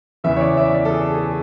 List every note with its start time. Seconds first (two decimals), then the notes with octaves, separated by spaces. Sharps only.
0.24 E2 C#3 E3 E5
0.36 C#5
0.41 D5
0.57 E5
0.74 D5
0.85 A4
0.91 G#4
1.14 G#4